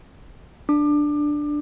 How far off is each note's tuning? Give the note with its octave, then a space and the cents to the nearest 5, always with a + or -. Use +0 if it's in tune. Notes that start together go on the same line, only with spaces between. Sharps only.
D4 +5 D6 +30